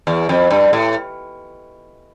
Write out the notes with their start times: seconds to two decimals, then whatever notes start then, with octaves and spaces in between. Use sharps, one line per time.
0.07 E2
0.29 F2
0.50 G2
0.73 A2